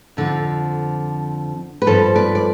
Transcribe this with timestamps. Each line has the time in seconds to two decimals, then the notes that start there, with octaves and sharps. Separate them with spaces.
0.17 F2 D3 F3
1.82 B4
1.87 G2 F3 A4 C5
2.16 B4 D5
2.35 D5